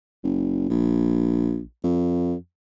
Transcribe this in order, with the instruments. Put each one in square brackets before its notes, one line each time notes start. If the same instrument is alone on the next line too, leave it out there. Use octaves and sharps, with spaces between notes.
[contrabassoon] F#1
A#1
F2